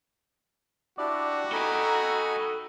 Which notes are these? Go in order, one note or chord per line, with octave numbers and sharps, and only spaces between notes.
D4 E4 F#4 G4 D5
D#4 A4 G5 G#5 A#5 B5